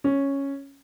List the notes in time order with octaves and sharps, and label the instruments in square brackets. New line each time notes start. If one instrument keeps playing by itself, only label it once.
[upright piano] C#4